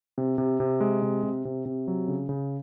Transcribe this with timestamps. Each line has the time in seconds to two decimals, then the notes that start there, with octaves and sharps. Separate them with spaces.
0.18 C3
0.38 C3
0.60 C3
0.80 G#3
1.02 C3
1.23 C3
1.45 C3
1.65 C3
1.88 F#3
2.08 C#3
2.29 C#3